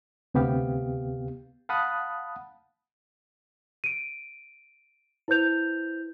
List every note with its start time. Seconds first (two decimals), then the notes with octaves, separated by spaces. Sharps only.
0.34 D2 C3 B3 G4 F5
1.69 F5 F#5 A5 B5 D#6 F#6
3.84 D7 D#7
5.28 E4 B4 C5 G6 F7